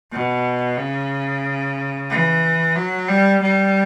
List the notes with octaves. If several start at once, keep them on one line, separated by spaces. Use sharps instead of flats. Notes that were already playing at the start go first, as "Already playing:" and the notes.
B2
C#3
E3
F#3
G3
G3